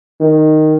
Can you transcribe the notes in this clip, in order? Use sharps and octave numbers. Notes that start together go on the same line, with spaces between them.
D#3